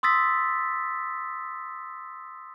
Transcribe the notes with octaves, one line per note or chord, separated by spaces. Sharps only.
C6 D#6 E6 A6 B6